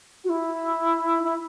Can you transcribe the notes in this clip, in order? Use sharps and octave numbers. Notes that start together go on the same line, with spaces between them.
F#4
E4
E4